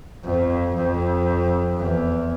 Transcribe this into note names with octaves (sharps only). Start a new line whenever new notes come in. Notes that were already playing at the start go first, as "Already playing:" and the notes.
F2
F2
E2